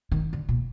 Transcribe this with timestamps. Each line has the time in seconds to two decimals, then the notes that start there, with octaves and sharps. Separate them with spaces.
0.12 D#3
0.33 D3
0.49 A#2